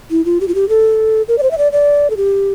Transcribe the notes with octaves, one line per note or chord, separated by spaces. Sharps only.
E4
F4
G4
F4
G4
A4
A#4
D5
C5
E5
D5
D5
A4
G4